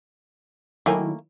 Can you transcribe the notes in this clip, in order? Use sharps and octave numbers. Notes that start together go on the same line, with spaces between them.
D#3 F#3 A3 A#3 E4 G#5